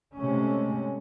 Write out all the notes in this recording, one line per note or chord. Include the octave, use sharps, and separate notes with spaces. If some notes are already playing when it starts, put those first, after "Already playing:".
C3 G#3 A3 C#4